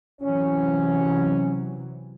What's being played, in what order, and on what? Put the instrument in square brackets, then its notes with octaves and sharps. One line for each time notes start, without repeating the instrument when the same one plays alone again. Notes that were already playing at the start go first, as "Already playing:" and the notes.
[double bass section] C3 E3 F#3 [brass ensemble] C#4